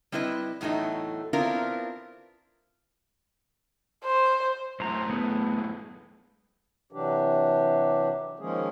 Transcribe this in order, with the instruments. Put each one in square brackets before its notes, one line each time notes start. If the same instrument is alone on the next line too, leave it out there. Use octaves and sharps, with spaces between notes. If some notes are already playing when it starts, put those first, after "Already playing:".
[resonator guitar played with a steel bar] G3 C4 E4 B4 D#5
E2 A2 F#3 A3 D#4
B3 C4 D4 E4 F4 A#4
[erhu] C5
[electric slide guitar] F#2 A2 [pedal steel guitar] C5 A#5
[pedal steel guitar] A3 B3 G#4
[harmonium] C3 E3 F#3 D4 G4
D#3 F3 G#3 A#3 C#4 G#4